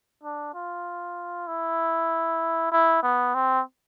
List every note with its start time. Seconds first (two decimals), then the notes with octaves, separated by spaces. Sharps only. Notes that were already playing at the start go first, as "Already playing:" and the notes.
0.23 D4
0.55 F4
1.47 E4
2.72 E4
3.03 B3
3.34 C4